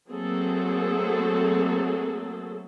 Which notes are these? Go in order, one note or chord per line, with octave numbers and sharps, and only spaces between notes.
F#3 A3 A#3 C4 G#4 A4